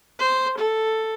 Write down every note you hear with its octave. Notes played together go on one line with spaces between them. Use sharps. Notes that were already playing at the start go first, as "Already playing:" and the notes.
C5
A4